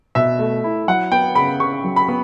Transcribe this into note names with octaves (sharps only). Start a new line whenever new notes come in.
B2 E5
A3
E4
F#3 F#5
B3 G5
C#3 B5
C#3 C#6
F#3
B5
B3